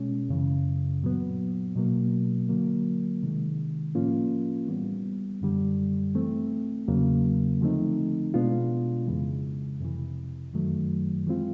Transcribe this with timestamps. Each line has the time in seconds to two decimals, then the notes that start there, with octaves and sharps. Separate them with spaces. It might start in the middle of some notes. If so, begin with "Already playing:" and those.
Already playing: B2 G#3 C#4
0.29 F#2 C#3 E3
1.03 A#2 F#3 B3
1.76 B2 F#3 A#3
2.49 D3 F#3 A#3
3.23 C3 D#3 G#3
3.95 A2 F3 A#3 C#4 F4
4.68 E3 G3 B3
5.41 F#2 D3 G3
6.15 E3 A3 C4
6.88 E2 C#3 F#3 A#3
7.61 D3 F3 A3 C4 D#4
8.34 B2 G#3 B3 D4 F4
9.07 F2 C#3 E3 G#3
9.80 F2 C3 E3
10.53 F#2 D#3 F#3 A3
11.27 E3 G#3 C4 F4